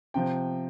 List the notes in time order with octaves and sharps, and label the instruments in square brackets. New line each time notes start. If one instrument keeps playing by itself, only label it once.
[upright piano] C3 F3 G5